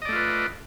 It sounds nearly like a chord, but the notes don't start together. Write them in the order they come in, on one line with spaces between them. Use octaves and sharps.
D#5 D5 A3 F4 B4